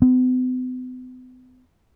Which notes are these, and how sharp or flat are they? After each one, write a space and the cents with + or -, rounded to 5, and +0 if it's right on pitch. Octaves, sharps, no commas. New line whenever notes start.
B3 +45